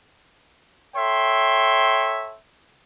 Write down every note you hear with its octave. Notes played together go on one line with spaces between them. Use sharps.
A4 C#5 E5 G5 C6